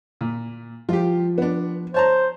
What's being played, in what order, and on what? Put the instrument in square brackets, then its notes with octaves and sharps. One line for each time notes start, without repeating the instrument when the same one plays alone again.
[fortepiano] A#2
[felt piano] F3 [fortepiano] F4 G4
[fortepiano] B3 D4
[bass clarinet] C5 [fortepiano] C#5 A5 A#5